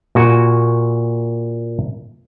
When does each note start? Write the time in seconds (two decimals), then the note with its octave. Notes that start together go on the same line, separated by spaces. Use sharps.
0.15 A#2 F#4 G#5